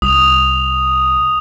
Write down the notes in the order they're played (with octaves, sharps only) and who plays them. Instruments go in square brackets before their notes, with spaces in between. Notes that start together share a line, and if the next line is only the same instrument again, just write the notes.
[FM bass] C2 [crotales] D#6 F7